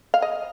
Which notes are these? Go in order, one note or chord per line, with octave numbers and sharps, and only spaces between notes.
F5
D#5